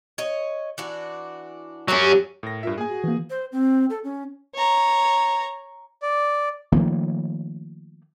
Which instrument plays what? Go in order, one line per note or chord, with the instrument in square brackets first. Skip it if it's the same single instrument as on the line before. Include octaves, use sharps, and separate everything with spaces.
[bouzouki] C#5 D#5
E3 D4 F#4
[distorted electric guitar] F#3 C#4 [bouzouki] G3 A3 G4
[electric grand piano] A2 A#4 A#6
[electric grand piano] G2 A#4 E5 [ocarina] F4
[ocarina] A#3 [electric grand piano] G#4 G#5
[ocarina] F#4
[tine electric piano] E3 A#3
[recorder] C5
C4
A4
C#4
[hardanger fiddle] C#5 A#5
[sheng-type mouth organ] D5
[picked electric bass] D#3 F3 A3 A#3